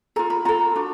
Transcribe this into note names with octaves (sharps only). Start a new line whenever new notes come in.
F4 A4 A#5
B5
F4 A4 A#5
D4 F#4